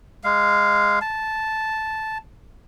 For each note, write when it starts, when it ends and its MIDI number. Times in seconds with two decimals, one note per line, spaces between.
0.24 0.99 56
0.24 0.99 77
1.01 2.18 81